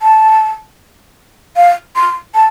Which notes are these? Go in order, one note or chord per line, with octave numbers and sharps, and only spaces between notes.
A5
F5
C6
A5